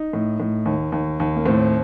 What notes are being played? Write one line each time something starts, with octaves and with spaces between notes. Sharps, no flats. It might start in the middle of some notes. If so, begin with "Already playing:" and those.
Already playing: D#4
A2
A2
D#2
D#2
D#2
A#3
A2 C4